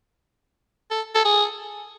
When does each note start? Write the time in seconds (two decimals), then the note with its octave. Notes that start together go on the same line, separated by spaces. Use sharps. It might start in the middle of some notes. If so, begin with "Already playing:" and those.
0.91 A4
1.15 A4
1.24 G#4